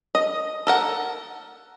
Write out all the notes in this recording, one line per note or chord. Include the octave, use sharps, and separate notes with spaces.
D#5
A4 A#4 F#5